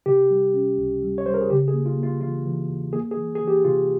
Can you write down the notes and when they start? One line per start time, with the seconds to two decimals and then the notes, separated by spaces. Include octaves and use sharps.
0.06 C3 G4
0.31 G3
0.54 C#4
0.78 C#2
1.02 G3
1.18 C#5
1.26 G3 C5
1.34 A#4
1.41 G#4
1.50 C#3 G4
1.68 G#4
1.73 A#3
1.86 F4
1.97 A#3
2.03 F4
2.21 E3 F4
2.46 E3
2.70 E2
2.93 A#3 G#4
3.11 G#4
3.17 E3
3.35 G#4
3.41 E3
3.47 G4
3.64 C3 F4